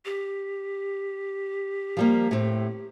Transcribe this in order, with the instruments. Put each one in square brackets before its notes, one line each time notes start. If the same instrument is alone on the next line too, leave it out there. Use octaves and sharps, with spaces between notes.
[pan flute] G4
[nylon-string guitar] F3 G3 A#3
A2 C4